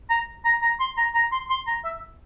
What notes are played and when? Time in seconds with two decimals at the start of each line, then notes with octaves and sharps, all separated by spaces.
0.10 A#5
0.45 A#5
0.62 A#5
0.80 C6
0.97 A#5
1.15 A#5
1.32 C6
1.50 C6
1.67 A#5
1.85 E5